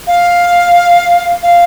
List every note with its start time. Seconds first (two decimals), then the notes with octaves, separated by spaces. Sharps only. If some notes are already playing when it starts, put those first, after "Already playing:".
0.07 F5
1.43 F5